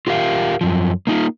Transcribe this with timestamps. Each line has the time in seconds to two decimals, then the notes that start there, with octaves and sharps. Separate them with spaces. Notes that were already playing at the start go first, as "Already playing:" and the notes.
0.07 F4 G4 A#4 F5
0.61 F#2 F3
1.07 A#3 D#4 F4